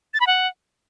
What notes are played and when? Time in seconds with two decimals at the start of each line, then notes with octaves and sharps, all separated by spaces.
0.14 A6
0.20 B5
0.27 F#5